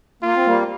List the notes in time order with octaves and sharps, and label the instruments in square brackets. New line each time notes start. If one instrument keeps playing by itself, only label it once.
[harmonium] A#3 [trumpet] F4
[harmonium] C4
G3 A#3